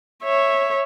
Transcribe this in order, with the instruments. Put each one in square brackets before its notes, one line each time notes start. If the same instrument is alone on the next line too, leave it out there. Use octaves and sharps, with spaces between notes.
[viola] C#5 E5